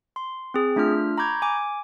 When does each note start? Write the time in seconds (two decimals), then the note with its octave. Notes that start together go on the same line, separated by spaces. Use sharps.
0.16 C6
0.54 C4 G#4
0.76 A3 D4 F4 E5 F6
1.18 A#5 B5 C#6 D6 G6 G#6
1.42 G#5 D6